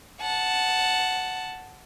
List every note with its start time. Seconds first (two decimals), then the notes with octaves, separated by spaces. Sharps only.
0.21 F#5 A5